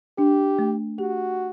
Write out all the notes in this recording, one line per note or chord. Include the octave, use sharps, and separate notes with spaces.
D4 G4
A3
F#4 G4